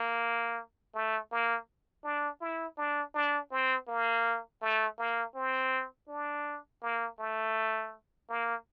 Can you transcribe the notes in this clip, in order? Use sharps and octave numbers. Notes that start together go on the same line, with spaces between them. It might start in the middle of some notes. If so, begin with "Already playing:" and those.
Already playing: A#3
A3
A#3
D4
E4
D4
D4
C4
A#3
A3
A#3
C4
D4
A#3
A3
A#3